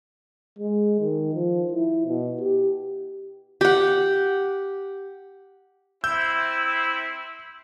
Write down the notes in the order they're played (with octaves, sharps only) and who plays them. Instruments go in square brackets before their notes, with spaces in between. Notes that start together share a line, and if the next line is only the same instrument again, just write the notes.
[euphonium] G#3
D#3
F3
E4
B2
G4
[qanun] G4 F#5
[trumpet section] C4 E4 [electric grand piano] E6 G6